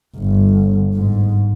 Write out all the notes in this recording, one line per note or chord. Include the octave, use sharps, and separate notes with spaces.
G1
G#2